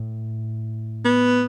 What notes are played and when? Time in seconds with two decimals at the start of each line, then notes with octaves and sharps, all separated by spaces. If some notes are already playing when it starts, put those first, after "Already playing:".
Already playing: A2
1.05 B3